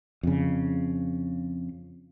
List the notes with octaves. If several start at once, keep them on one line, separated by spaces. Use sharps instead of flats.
F2 C#3